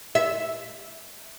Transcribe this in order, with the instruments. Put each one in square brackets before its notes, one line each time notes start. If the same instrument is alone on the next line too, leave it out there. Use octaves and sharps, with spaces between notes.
[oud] E5